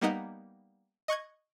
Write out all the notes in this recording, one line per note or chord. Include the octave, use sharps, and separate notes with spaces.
G3 A#3 B3 D#4 D#5 F#5
D#5 C#6 F#6 G#6